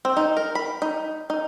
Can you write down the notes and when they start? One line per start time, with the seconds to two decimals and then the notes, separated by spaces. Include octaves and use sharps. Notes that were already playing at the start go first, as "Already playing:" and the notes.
0.05 C4
0.17 D#4
0.37 A#4
0.55 B5
0.82 D#4
1.30 D#4